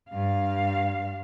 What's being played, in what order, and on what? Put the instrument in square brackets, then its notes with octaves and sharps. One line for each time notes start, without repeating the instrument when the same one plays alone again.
[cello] G2 F5